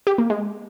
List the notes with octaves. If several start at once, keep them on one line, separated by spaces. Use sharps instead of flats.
G4
A#3
G#3